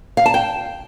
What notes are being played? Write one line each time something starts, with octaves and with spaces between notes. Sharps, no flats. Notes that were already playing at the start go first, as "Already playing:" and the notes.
F5
A5
G5